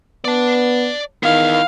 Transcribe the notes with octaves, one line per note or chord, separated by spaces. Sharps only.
B3 D5 A5
D#3 B3 E4 F5